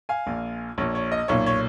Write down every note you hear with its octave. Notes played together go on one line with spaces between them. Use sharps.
F5 G#5
A#1 A#2
A#1 A#2 C#5
C#5
D#5
B1 A#2 C#5
C#5